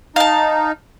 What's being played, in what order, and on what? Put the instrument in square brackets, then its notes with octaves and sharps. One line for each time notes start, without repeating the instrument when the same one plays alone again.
[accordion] D#4 [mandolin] F5 A5